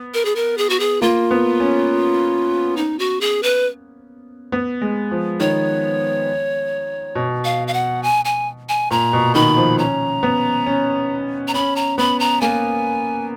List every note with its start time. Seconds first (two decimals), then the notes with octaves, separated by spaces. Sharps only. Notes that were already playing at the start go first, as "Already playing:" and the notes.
Already playing: B3
0.14 A#4
0.25 G#4
0.36 A#4
0.58 G#4
0.70 F#4
0.80 G#4
1.02 A#3 F4
1.31 B3
1.60 C#4
2.77 D#4
2.99 F#4
3.21 G#4
3.43 B4
4.52 B3
4.81 G#3
5.11 F3
5.40 D#3 C#5
7.15 B2
7.45 F5
7.68 F5
7.74 F#5
8.03 G#5
8.25 G#5
8.69 G#5
8.91 A#2 A#5
9.13 B2
9.35 D#3 B5
9.57 F3
9.78 C#4 A#5
10.23 B3
10.66 C#4
11.48 A#5
11.54 C#4 B5
11.76 A#5
11.98 B3 B5
12.20 A#5
12.41 A#3 G#5